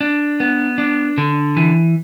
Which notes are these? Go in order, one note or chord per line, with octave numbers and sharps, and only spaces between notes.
D4
B3
D4
D3
E3